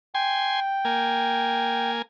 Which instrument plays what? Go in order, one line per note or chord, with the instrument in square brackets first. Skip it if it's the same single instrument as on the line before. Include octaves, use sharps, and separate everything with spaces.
[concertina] G5 [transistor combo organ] G#5 C6
[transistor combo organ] A#3 G#5